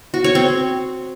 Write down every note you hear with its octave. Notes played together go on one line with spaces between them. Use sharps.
F#4
C#5
C4